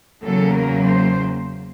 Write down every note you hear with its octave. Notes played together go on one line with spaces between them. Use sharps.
E2 C#3 F#3 A#3 A4
A#4
C5